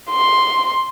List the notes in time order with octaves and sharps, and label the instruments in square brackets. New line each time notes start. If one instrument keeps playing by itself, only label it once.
[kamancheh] C6